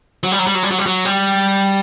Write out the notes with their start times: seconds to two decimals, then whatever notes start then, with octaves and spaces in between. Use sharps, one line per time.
0.23 F#3
0.32 G3
0.39 F#3
0.47 G3
0.54 F#3
0.63 G3
0.71 F#3
0.78 G3
0.86 F#3
1.05 G3